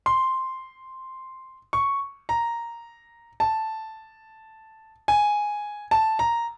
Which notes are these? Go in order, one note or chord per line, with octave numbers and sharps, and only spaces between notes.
C6
C#6
A#5
A5
G#5
A5
A#5